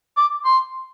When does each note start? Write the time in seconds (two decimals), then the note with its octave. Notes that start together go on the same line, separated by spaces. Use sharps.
0.17 D6
0.45 C6